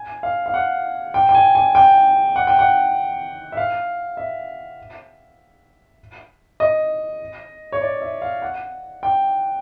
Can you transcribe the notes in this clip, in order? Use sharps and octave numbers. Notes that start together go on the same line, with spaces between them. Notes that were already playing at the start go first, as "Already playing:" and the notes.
Already playing: G#5
F5
F5
F#5
G5
G5
G#5
G#5
G5
F#5
G5
F#5
E5
F5
E5
D#5
C#5
D5
E5
F5
F#5
G5